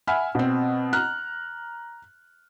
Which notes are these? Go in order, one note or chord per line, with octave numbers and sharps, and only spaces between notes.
E5 F#5 G#5 B5 F6
B2 C4
A#5 F6 F#6